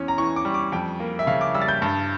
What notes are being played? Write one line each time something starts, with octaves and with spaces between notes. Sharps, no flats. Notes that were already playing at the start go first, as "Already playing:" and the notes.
Already playing: E2 C#4
A#5
E3 C#6
D6
G3
D6
F2 G5
A#3
E5
C#3 F5
D6
G3 E6
A6
G6
G2